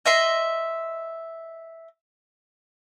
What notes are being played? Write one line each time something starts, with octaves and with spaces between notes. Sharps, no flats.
D#5 E5 C6